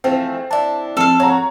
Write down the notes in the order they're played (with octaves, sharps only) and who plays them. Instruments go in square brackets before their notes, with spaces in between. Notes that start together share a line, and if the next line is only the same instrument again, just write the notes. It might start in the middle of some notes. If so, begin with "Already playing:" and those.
[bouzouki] E3 F3 A3 [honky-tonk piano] C4
[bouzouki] D4 E4 [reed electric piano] D5 A5
[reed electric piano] F3 C4 [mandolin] A4 F5 [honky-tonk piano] E6
[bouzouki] F#4 [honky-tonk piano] C#5 A#5